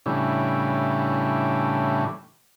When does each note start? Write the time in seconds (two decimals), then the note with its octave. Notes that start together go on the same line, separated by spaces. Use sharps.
0.06 A2 C#3 E3 G3 D4